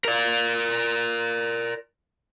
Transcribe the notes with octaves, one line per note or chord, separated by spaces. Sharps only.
A#4 D5